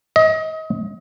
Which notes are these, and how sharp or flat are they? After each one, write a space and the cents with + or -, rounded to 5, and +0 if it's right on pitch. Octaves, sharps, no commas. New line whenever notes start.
D#5 +30